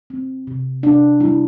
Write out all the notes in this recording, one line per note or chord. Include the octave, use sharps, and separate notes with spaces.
C4
C3
C3 D4
G3 E4